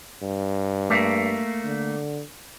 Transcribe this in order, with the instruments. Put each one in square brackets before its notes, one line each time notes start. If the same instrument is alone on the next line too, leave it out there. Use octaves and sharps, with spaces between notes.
[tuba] G2
[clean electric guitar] A3 A#3
[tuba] D3